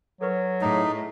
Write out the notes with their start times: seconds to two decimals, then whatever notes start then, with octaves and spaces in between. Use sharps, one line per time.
0.21 F#3 A4 B4 C#6
0.61 A2 D#4 G#4 A5